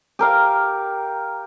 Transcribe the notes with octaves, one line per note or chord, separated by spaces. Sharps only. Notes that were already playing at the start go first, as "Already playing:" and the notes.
G4 A#4 F5